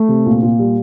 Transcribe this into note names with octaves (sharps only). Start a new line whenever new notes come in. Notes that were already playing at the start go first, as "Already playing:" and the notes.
Already playing: A3
C3
A#2
A#2
G3